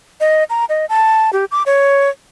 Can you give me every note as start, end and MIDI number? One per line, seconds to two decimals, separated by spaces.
0.20 0.44 75
0.50 0.65 82
0.69 0.86 75
0.89 1.30 81
1.33 1.45 67
1.51 1.63 86
1.66 2.09 73